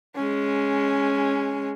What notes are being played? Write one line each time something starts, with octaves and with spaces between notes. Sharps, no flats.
G#3 C#4